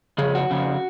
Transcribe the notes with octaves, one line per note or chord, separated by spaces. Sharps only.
F2 C#3 G#4
F#4
F2 C#3